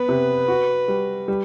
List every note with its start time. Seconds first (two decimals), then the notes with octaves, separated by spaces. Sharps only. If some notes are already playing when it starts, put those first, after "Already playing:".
Already playing: B3 B4
0.09 C3
0.48 F#4
0.88 G3
1.28 G3